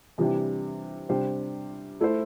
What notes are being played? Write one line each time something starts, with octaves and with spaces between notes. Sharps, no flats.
C3 E3 G3 D4 G4
C3 G3 D4 G4 C5
A3 E4 A4 C5